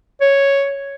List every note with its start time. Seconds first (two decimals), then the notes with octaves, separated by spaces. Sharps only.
0.21 C#5